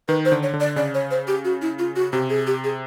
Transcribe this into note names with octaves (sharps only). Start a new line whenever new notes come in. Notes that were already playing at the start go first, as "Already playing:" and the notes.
D#3 B4
C5
D3
C#5
D3
D5
C#3 D5
C#5
C5
G4
F#4
E4
F4
F#4
C3 G4
G#4
G4
G#4